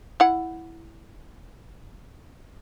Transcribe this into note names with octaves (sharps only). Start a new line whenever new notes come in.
E4 F#5